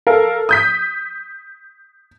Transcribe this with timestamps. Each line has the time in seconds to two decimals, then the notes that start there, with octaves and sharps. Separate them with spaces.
0.07 A4 A#4 F5
0.49 D#6 G6 B6